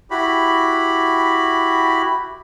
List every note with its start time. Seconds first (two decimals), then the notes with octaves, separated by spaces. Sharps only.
0.11 E4 F#4 G4 B5